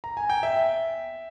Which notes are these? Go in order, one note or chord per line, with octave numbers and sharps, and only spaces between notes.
A#5
G#5
G5
E5